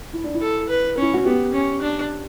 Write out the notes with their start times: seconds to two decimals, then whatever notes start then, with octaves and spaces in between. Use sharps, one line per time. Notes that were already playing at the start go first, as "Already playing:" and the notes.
0.13 E4
0.24 D4
0.34 E4
0.41 A4
0.69 B4
0.98 C#4 E4
1.14 F#4
1.26 B3 G4
1.53 C#4
1.82 D4